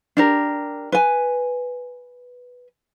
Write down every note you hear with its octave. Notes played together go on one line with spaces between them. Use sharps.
D4 G4 A#4
B4 G#5